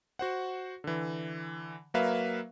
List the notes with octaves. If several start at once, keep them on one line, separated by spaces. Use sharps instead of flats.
F#4 C5 F#5
D3 E3
F#3 A#3 A#4 B4 E5 F5